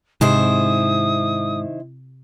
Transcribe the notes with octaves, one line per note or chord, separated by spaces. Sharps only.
G#2 C3 D#3 E4 C5 D#6